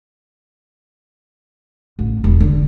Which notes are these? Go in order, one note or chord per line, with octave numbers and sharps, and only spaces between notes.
A1
E1
D3